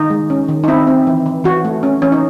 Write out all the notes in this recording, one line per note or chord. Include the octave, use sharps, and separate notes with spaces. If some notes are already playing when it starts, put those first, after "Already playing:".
Already playing: D#3 D#4
G#3
C#4
D#3
D#4
C4 E4
C4
E3
E3
E3 F#4
A3
C#4
E3 C#4
D#4